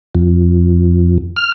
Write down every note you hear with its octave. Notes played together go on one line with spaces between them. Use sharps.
F2
F6